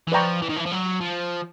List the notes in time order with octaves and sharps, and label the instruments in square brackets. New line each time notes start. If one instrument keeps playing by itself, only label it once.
[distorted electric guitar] E3
[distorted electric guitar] F3 [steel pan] B4 D5 G5 A#5 C#6
[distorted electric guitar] E3
D#3
E3
F3
F#3
F3